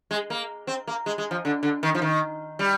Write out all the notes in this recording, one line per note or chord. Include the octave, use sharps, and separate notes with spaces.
G#3
A#3
C4
A#3
G#3
G#3
F3
D3
D3
D#3
F3
D#3
G3